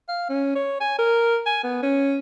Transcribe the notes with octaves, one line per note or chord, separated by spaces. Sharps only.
F5
C#4
C#5
G#5
A#4
G#5
B3
C#4